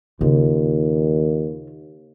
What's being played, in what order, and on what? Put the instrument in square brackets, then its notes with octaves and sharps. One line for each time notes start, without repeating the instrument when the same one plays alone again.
[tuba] D#2 [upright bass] C#3 F4